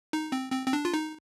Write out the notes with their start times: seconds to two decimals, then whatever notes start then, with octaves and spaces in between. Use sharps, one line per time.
0.13 D#4
0.32 C4
0.52 C4
0.67 C4
0.73 D4
0.85 F4
0.94 D#4